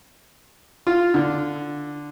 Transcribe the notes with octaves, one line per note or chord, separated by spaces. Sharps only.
F4
D3